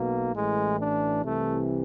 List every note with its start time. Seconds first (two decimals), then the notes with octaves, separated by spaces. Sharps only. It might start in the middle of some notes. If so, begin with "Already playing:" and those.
Already playing: B1 B2 A#3
0.35 A1 A2 E3 G#3
0.79 D4
1.24 C2 C3 E3 A3